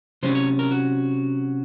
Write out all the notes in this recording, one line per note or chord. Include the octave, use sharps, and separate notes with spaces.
C3 F#3 C#4 C5
C#5
A#4
F#4